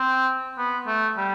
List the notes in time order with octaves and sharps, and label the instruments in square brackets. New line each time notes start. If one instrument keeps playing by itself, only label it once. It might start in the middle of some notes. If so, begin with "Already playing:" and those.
Already playing: [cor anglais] C4
B3
A3
G3